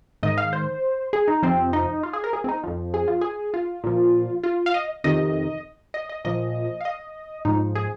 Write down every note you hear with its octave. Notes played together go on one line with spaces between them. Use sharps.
G#2 D#3 D#5
F5
C5
G#4
D#4
F2 C3 F3 C4
D#4
F4
G#4
A#4
G#4
C4
D#4
F2 F3
G#4
F4
G#4
F4
A#2 F3
F4
F5
D#5
F2 C3 D#3 D#5
D#5
D#5
A#2 F3 D#5
F5
D#5
G#2 F3 D#4
G#4